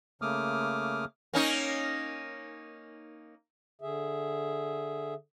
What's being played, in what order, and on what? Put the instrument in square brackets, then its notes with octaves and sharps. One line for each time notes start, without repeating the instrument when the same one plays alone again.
[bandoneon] C#3 A3 A#3 D6 D#6 F6
[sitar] A#3 C#4 D#4
[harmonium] D3 G#4 E5